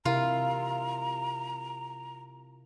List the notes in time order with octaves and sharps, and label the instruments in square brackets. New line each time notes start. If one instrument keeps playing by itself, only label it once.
[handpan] C3 E4 A#4 [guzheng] F4 [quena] A#5